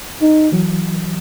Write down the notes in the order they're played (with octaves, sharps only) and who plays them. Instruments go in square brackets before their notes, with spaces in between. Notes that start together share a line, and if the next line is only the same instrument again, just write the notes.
[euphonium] D#4
[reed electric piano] E3 F#3